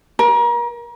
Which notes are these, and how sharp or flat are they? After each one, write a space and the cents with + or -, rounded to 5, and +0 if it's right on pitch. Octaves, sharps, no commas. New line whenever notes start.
A#4 +35